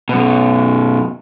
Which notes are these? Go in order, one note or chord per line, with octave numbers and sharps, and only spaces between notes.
F#2 B2